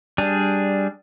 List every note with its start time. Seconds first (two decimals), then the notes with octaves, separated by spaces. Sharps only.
0.18 G3 D4 G#4